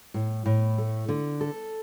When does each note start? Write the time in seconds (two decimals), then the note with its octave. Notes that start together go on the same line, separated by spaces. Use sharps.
0.14 A2
0.46 A2
0.78 A3
1.09 D3
1.41 A4